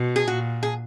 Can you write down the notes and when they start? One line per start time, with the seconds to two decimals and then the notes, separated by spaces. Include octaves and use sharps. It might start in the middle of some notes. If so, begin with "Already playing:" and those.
Already playing: B2
0.16 G#4
0.28 A#2 F#4
0.63 G#4